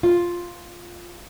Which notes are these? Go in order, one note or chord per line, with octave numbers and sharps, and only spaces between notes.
F4